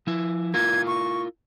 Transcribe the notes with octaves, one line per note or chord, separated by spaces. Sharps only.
F3 E4
E4 F4 A#4 G#6
C#6